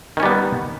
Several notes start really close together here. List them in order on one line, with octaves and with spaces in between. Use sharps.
D#3 C#4 G3 B3